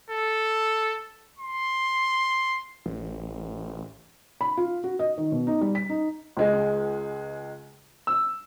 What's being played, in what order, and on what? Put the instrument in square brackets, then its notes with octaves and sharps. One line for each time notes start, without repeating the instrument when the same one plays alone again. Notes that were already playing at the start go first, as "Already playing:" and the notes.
[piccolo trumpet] A4
C6
[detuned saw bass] A1
[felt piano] B5
F4
F#4
D#5
D#3
B2
D#4
G3
B6
D#4
[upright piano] C#2 G#3
E6